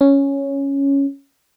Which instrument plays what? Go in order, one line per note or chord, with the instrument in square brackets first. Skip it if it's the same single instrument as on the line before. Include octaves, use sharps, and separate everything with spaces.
[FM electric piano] C#4